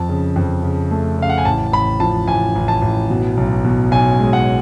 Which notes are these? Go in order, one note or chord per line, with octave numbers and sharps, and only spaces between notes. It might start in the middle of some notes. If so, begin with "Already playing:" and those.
Already playing: F2 A5
C#3
F2
C#3
A3
C#3 F5
F#5
G#5
A1 A5
A1 B5
F3 A5
A1 G#5
A1
A5
A1
B2
B1
B2
B1 G#5
G#3
F#5